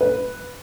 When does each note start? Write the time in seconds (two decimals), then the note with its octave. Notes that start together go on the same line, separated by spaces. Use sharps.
0.01 B4